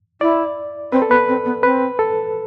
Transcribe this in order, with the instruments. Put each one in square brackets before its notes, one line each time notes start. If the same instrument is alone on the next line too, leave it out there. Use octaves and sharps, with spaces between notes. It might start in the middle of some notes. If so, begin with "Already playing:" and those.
[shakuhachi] E4 [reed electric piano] D5
[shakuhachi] C4 [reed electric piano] B4
[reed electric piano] A4
[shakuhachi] B3 [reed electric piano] B4
[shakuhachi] C4
B3
[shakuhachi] C4 [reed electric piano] B4
[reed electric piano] A4